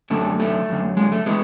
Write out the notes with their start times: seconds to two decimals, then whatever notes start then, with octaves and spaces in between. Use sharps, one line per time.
0.10 F#2 D3 A3
0.39 A3
0.69 F#2 D3
0.97 G#3
1.12 A3
1.26 E3 G#3 B3